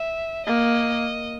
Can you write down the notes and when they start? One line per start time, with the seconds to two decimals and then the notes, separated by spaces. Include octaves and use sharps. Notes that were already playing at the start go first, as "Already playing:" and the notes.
Already playing: E5
0.46 A#3 D#5